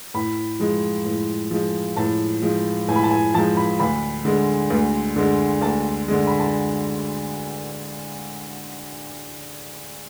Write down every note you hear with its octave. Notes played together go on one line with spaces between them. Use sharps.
A2 B5
F3 G#3
A2
F3 G#3
A2 A5
F3 G#3
A2 G#5
B5
A5
G#5
F3 G#3 A5
B5
D2 B5
D3 G#3
D2
D3 G#3
D2 A5
D3 G#3
B5
A5